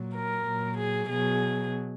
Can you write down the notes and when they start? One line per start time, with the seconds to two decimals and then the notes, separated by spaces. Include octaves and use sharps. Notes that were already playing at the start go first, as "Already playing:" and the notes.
Already playing: A#2 F#3
0.15 A#4
0.46 A#2 F#3
0.79 G#4
1.10 B2 F#3 G#4